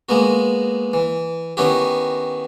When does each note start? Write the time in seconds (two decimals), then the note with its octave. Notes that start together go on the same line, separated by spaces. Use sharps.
0.09 G#3 A#3 B3 F#4
0.93 E3
1.57 D#3 B3 C#4 E4 F#4 G4